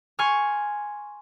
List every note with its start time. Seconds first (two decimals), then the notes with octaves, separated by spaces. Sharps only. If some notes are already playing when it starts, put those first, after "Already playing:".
0.19 G#5 C6 C#6 F6